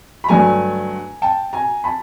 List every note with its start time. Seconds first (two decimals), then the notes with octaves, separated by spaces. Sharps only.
0.24 B5
0.29 G2 D3 F#3 A3 G#5 A#5
1.22 G5 A5
1.53 G#5 A#5
1.84 A5 B5